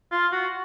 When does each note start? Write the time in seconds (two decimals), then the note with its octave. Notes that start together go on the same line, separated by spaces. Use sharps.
0.11 F4
0.32 F#4